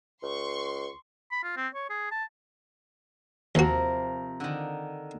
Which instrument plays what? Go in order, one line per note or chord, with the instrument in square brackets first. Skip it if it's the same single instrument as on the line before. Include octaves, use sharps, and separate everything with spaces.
[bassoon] C#2 [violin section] C6 C#6
[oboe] B5
F4
C4
C#5
G#4
A5
[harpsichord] D#2 F#4 [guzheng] C3 F3 A#4
[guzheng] D3 D#3